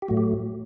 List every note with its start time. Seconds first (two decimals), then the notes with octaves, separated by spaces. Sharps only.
0.02 G4
0.08 A2 F#3 A3 F#4
0.17 G4